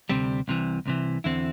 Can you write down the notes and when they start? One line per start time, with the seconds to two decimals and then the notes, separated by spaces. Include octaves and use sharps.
0.09 D2 C3 G3 C4
0.48 C2 C3 E3
0.86 C2 C3 E3
1.24 E2 D3 C4 E4